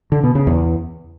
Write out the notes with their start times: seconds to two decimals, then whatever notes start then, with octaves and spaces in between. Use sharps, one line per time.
0.12 D3
0.23 B2
0.35 C#3
0.47 E2